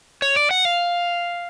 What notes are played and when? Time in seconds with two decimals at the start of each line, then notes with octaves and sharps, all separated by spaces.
0.22 C#5
0.36 D5
0.51 F#5
0.65 F5